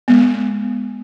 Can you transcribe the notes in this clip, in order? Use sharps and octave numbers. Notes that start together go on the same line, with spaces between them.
G#3 B3